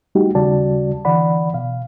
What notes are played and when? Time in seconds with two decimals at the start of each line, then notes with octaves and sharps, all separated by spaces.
0.15 G3 A3 D#4 F#4 G4
0.35 D#2 C#3 G3 F#4 D5 A5
1.05 D3 E3 D5 F#5 B5
1.54 B2 F5